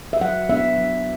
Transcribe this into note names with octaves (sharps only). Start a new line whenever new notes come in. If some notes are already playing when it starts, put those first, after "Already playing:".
E5
F#3 F#5
B3 D4 E5
F#3